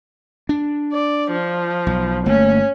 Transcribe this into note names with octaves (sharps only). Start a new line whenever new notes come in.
D4
D5
F3
B1
G1 A3 A#3 C#4